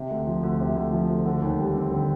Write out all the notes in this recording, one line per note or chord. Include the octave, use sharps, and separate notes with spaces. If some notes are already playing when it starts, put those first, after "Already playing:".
Already playing: C3
D2
F3
D2
C3
D2
F3
D2
D3
D#2
G3
C4
D3